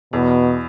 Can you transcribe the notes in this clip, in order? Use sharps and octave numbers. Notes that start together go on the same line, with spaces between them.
E2 B2